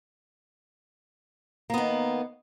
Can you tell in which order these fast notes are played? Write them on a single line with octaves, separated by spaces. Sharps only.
A#3 B3 D#3